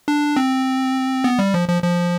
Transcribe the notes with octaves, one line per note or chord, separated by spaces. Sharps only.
D4
C4
B3
G3
F3
F3
F3